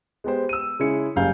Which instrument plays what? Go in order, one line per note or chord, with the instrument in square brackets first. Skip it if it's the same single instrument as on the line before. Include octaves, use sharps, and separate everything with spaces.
[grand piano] G#3 B3 G4 C5
E6 D#7
C#3 G#3 C#4 E4 G#4 C#7
F#1 C#3 G3 F5 G#5 G6